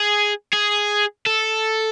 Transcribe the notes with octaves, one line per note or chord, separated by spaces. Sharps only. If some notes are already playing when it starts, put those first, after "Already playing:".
Already playing: G#4
G#4
A4